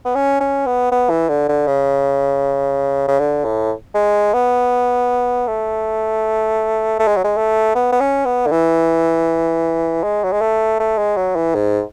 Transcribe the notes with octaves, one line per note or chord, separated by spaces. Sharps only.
B3
C#4
C#4
B3
B3
E3
D3
D3
C#3
C#3
D3
A2
G#3
B3
A3
A3
G#3
F#3
G#3
A3
B3
B3
C#4
B3
D3
E3
G#3
F#3
G#3
A3
A3
G#3
F#3
E3
G#2